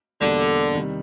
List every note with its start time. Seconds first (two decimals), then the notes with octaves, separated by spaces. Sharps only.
0.21 E2 B2 D3 G3 A#3 D4
0.75 C3 D#3 G3